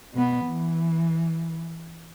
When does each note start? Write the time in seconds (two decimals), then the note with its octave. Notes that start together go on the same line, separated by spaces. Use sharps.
0.13 B2 B3
0.47 E3